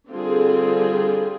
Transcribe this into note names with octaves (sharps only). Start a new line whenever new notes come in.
D3 G3 C4 F4 G#4